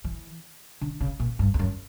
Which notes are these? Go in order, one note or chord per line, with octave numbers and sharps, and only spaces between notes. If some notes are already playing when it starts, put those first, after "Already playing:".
E3
D3
C#3
A#2
G2
E2
F#2